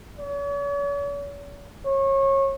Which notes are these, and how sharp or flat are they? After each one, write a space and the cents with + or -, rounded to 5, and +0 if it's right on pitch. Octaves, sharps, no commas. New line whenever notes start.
C#5 +45
C#5 -25